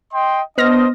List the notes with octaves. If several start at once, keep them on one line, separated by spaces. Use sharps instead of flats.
D#5 G5 C6
B3 D4 C5 D#5 F6 A#6